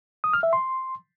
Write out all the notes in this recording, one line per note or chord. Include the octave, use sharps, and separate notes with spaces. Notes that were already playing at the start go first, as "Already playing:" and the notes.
D#6
F6
E5
C6